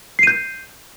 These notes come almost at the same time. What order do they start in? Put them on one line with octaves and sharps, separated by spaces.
C7 D#7 G6